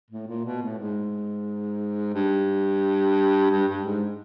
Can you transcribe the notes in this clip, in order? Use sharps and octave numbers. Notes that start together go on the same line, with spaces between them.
A2
A#2
B2
A2
G#2
G2
G2
G2
G#2